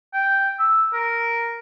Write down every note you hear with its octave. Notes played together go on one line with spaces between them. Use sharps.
G5
E6
A#4